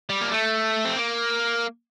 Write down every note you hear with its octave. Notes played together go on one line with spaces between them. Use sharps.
G3
A#3
A3
C4
A#3